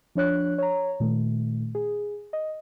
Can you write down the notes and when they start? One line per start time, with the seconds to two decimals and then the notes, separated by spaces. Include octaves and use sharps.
0.15 F3 D4 C#5 F#6
0.58 C#5 A#5
1.00 A#2 D#3 A3
1.75 G#4
2.33 D#5